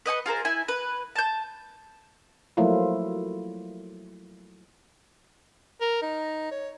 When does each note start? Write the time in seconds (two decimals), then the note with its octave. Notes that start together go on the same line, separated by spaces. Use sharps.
0.06 B4 D#5 G5 C#6
0.26 F4 G#4 A#4 C5
0.45 E4 G#5
0.68 B4
1.16 A5 G6
2.57 F3 F#3 A3 A#3 E4 F4
5.81 A#4
6.02 D#4
6.52 C#5